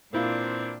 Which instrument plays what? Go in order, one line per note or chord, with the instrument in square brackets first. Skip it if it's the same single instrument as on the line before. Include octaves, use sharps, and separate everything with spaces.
[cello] A#2 D4 [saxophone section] D#3 E3 C4 [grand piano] A#3 E4 F4